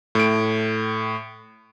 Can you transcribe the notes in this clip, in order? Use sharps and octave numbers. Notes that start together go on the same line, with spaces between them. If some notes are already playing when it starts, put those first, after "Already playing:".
A2 D7